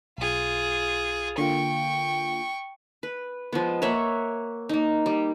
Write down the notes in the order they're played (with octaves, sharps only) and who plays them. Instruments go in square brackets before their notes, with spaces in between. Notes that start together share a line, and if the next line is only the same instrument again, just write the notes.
[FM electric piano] B1 [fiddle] F4 G#4
[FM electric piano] D3 A#3 F4 [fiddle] G5 C#6
[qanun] B4
F3 G#3 B3
A#3 C#5 E5 F#5
A#3 D#4
G3